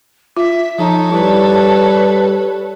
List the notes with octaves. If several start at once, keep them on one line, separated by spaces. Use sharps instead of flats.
F4 E5
F3 D#4 A4 C#5
G3 E4 B4